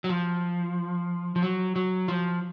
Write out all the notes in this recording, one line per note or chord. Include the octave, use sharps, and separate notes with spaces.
F#3
F3
F3
F#3
F#3
F3